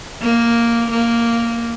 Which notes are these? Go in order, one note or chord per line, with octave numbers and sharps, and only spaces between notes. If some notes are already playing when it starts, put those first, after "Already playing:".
A#3
A#3